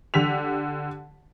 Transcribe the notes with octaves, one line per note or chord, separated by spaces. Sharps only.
D3 G4 B6 F7